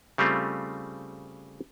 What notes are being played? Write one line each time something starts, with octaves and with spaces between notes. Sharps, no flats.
C#3 G3 A3 C4 F4